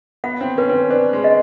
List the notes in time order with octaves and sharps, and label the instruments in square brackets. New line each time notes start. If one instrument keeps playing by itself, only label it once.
[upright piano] B3 [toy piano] F#5
[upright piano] C4
[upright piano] C#4 [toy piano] B4
[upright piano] C4
C#4
[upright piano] D4 [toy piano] C5
[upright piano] G#3
[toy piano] D#5